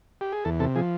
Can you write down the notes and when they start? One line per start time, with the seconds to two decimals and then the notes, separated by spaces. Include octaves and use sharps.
0.21 G4
0.32 G#4
0.45 E2 A4
0.60 C3 A4
0.76 F3 G#4